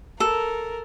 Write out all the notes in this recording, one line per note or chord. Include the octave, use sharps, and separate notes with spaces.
A4 A#4